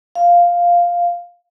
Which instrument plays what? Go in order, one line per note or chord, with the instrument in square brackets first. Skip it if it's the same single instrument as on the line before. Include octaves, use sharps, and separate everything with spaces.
[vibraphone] F5